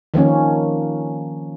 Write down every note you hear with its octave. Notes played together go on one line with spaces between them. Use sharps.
D#3 F3 A#3 C#4